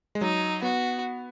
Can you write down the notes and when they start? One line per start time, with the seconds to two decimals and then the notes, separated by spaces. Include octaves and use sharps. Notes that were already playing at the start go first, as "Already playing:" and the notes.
0.15 G#3
0.21 F#3 D#4
0.62 B3 F#4